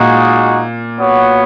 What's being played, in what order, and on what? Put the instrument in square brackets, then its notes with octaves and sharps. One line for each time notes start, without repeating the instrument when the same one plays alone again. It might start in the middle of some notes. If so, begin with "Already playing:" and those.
Already playing: [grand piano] A#2 [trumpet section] G#3 D#4 F#4
[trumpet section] B3 F#4 C#5